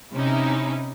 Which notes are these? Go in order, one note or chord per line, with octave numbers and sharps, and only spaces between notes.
C3 C#4 D#4 E4